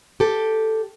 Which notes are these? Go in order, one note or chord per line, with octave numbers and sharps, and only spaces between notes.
G4 A4